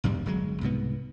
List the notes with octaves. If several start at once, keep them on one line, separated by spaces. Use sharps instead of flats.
G#1 E2 G2 G3
G1 F#3 G#3
C2 G#2 B2 B3